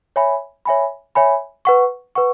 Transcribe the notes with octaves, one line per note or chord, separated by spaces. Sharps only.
C#5 E5 G#5 B5
C#5 E5 G#5 B5
C#5 E5 G#5 B5
B4 F#5 C#6
B4 F#5 C#6